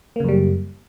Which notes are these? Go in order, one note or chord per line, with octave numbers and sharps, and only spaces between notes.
F#2 C#3 G3 A#3